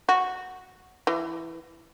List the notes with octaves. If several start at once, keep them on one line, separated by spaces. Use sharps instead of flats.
F#4
E3